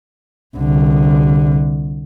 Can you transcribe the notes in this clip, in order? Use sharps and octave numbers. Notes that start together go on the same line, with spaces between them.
C2 D3